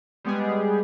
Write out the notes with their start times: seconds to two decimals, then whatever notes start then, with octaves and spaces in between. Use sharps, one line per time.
0.25 G3 G#3 B3 G4 G#4